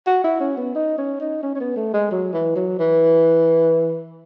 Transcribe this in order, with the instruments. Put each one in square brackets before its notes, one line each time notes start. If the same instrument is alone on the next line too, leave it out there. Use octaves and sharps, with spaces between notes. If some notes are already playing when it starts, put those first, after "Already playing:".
[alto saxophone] F#4
E4
C#4
B3
D#4
C#4
D#4
C#4
C#4
B3
A3
G#3
F#3
E3
F#3
E3